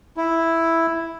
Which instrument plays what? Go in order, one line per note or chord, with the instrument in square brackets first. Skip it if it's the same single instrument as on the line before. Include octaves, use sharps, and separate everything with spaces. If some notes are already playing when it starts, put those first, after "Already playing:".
[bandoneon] E4